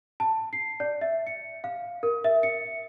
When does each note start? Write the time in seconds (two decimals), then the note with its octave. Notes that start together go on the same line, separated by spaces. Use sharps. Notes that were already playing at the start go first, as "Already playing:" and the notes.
0.20 A5
0.53 C7
0.80 D5
1.01 E5
1.27 C#7
1.64 F5
2.03 A#4
2.24 E5
2.43 C#7